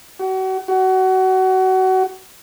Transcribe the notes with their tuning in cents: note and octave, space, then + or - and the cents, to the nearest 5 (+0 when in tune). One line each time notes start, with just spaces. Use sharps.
F#4 +35
F#4 +25